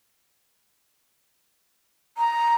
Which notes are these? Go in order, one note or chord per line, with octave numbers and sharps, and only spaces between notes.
A#5